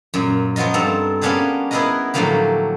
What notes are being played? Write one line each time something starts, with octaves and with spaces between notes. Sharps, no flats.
F#2 A#2
F3 F#3 B3 F4 D#5
G2 A#3 C4 A4 A#5
A#3 B3 C#4 D4 G4 G#4
B3 E4 G#4 A#4 B4 D#5
A2 D3 F3 F#3 A#3 G4